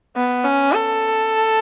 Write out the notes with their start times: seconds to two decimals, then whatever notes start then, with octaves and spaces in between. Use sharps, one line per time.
0.16 B3
0.44 C#4
0.73 A4